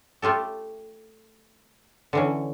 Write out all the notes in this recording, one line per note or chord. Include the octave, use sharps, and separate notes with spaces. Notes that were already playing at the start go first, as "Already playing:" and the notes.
A3 F4 G4 A4
D3 E3 C#4